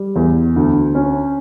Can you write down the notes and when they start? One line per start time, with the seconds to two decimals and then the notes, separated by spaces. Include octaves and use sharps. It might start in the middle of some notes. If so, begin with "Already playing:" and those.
Already playing: G3
0.16 E2
0.56 D2
0.95 C#4